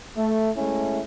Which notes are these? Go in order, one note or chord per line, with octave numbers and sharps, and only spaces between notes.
A3
G#3 A3 C#4 E4